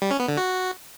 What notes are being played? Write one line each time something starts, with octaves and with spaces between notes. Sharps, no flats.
G3
C#4
B3
D3
F#4